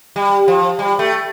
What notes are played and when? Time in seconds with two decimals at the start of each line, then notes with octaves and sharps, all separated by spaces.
0.16 G3
0.48 F3
0.79 G3
0.99 A3